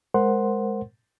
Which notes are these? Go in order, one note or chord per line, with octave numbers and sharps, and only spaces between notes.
G#3 A#4 C5 F#5 C6